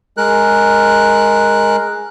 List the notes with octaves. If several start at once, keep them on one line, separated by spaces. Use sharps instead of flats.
G#3 A#4 F#6